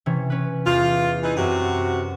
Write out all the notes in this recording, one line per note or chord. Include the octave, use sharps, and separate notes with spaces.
C3 E3 C#4
C#4 B4
E2 F4
E3 D#4
F#2 C3 F#3 F#4